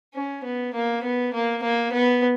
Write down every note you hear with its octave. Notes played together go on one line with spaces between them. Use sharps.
C#4
B3
A#3
B3
A#3
A#3
B3